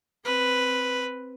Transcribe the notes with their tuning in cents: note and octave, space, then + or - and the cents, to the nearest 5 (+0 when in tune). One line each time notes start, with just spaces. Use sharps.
C4 +0 B4 +0